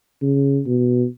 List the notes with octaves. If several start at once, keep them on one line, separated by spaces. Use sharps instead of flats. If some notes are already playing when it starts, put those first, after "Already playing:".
C#3
B2